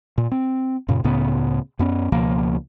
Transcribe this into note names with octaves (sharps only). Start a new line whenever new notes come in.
A#2
C4
F#2 A#2 C#3
C#2 A2 C#3 B3
F#2 B3 C#4
C#2 B2 F3 A#3